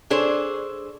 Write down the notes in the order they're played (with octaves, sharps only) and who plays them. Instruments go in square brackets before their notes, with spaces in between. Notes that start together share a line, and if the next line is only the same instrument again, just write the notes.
[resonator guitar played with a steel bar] D4 G#4 A4 C5 C#5